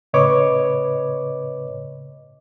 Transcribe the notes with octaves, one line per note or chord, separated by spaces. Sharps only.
A2 C#3 B4 C#5 D#5 D6